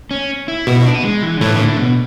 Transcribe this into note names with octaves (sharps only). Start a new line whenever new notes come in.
C#4
E4
B2 F#4
E4
D4
B3
G#3
E3
D3
A2 E3
E3
D3
C#3
B2